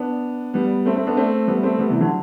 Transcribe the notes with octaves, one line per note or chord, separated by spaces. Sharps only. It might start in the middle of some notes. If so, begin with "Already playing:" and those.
Already playing: B3 D4
G3 B3
A3 C4
A3 C4
B3 D4
A3 C4
G3 B3
A3 C4
G3 B3
C3 E3
D3 F#3